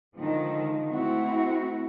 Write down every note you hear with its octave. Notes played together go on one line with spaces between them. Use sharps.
D3 D#3 F3 G#3
A3 C4 E4 F#4